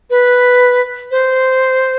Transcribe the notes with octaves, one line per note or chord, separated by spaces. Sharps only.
B4
C5